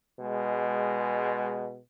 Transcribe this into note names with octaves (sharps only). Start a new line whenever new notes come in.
B2 G#3